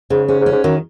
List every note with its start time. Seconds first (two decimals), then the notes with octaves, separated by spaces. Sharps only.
0.10 G#2 C#3
0.28 G#2 C#4
0.40 G#2
0.46 C#4
0.52 G#2
0.64 F#2 D#3